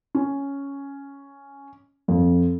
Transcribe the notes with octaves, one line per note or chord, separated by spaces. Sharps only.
C#4
F2